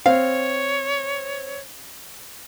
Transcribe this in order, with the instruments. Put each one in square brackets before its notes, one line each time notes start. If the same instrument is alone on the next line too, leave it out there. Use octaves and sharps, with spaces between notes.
[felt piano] C4 [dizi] C#5 [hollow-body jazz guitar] F5